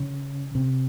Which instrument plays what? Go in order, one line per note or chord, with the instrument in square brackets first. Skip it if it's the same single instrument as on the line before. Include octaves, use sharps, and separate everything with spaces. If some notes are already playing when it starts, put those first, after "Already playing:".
Already playing: [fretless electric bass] C#3
C3